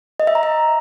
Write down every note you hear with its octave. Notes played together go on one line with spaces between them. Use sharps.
D#5
E5
A#5
E5